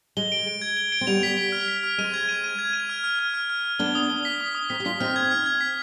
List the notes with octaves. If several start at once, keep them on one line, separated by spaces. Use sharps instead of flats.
G#3 G7
D7
D7
G#6
G7
D7
C4
G3 B3 F7
B6
B6
F6
B6
F6
G#3 C4 D#7
G#6
D#7
D#7
G#6
D#7
F6
F6
F6
F6
F6
F6
B3 D4 G7
D#6
G7
B6
D#6
D#6
C4 D#4 B6
G4
D4 F4 B6
C4 D#4 F6
G#6
F6
G#6
B6